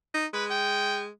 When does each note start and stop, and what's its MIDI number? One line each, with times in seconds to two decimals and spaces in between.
0.14 0.26 63
0.33 1.08 56
0.33 0.45 71
0.50 1.01 79